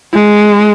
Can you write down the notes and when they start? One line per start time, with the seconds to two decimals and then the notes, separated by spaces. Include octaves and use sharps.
0.13 G#3